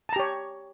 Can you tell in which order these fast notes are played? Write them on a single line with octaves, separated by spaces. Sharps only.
A5 A#5 G4 C#5